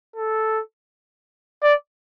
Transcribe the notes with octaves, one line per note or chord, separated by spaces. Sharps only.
A4
D5